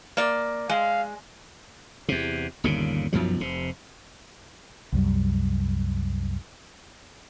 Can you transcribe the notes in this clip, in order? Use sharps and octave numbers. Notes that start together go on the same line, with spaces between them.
A#3 D5
G#3 F5
E2 C3
G1 D#2 A#2 C#3
B1 F#2 F3 F#3
F1 C3
C2 F#2 G3